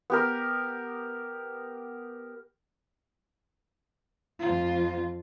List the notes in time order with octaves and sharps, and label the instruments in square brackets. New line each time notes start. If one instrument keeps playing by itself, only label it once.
[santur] B3 G4 A#4
[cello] F2 F4